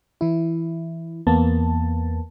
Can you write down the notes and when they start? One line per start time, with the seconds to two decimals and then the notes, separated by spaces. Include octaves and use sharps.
0.21 E3 E4
1.27 E2 A#3 B3 A5